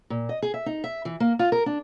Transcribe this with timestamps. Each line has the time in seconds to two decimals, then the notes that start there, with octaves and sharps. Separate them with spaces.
0.10 A#2
0.29 D#5
0.42 G#4
0.54 E5
0.66 D#4
0.84 E5
1.05 E3
1.20 A#3
1.39 F4
1.52 A#4
1.66 D4